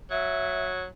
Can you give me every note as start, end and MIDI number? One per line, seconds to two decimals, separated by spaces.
0.11 0.85 54
0.11 0.68 76